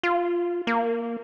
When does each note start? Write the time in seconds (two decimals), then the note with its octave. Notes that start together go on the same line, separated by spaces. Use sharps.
0.03 F4
0.67 A#3